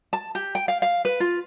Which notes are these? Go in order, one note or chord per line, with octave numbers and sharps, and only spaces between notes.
A5
G4
G5
F5
F5
B4
F4